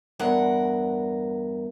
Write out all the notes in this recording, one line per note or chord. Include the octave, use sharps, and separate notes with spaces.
E2 G2 A#4 F#5